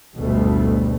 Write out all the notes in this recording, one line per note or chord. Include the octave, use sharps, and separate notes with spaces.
F#1 D2 B2 G3 A3